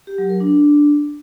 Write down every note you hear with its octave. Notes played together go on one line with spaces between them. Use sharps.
G4
F#3
A#4
D4